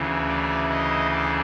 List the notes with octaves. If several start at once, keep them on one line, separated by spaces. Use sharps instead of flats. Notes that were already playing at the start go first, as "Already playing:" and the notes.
Already playing: D2 C#3 E3
D5
D#5
D5